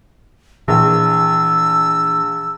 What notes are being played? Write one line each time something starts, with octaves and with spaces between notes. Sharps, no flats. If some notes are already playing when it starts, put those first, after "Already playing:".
A#1 E3 E6